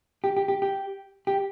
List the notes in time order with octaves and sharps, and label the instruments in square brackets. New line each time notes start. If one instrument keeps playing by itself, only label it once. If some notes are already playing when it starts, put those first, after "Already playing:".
[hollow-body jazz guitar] G4
G4
G4
G4
G4